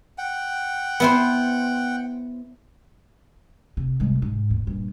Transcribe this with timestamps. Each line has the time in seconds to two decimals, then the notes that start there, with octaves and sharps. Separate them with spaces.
0.18 F#5 G5
1.00 B3 E4 C5
3.77 C3
4.00 C2 G#3
4.22 G#2
4.50 A1 D#2
4.67 G2 A#2